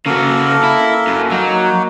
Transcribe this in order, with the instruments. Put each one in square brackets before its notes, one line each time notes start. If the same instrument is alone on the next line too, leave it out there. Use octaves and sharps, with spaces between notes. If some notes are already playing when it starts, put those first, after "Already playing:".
[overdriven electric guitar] C#3 F#4 [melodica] A#3 A4 A#4
[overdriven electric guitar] E4
F#2
[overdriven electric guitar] F#3 [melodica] A#3 D#4 F#4